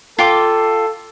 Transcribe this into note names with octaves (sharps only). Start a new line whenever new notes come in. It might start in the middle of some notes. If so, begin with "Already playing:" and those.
F4 A4 G5 D6